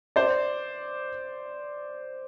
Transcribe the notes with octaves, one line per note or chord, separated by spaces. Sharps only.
C5 D5